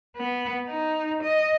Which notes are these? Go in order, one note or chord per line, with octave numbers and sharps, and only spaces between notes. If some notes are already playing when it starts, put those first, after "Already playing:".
B3
D#4
D#5